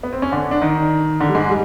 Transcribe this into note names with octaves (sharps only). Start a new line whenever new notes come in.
B3
C4
C#4
D3 D4
D4
D#3 D#4
D3 D4
G3
G#2 G#3
G3